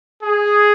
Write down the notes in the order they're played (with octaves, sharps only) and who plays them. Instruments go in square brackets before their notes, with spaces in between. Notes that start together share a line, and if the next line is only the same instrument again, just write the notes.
[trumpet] G#4